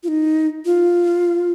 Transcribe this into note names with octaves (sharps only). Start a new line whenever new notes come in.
F4
D#4
F4